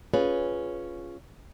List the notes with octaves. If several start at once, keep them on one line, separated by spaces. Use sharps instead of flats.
C#4 F4 G#4 B4